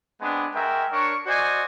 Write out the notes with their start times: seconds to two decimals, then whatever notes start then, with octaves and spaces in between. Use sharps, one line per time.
0.21 G#3 B3 C4 D4
0.54 G#3 F#4 A#4 E5 G5
0.90 D4 A#4 C#5 C#6
1.26 F#4 C5 D5 D#5 G#5